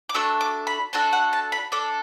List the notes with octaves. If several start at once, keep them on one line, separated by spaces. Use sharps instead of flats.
D6
A3 D4 F#4 A4 E6
D6
B5
A3 D4 F#4 A4 A5
F#5
A5
B5
D4 A4 D6